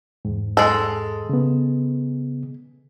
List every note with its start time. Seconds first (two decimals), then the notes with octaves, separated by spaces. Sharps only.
0.25 E2 G#2
0.57 G#3 A4
1.29 C#3 B3